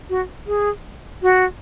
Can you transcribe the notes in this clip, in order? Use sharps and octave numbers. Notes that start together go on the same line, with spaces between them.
F#4
G#4
F#4